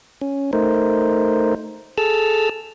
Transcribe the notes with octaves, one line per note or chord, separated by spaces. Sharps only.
C#4
A3 D#4 A#4 C5
G#4 A4 A5 E6 F6